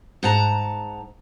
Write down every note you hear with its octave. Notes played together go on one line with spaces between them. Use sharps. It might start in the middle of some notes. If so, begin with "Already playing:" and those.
G#2 F#5 A5 A#5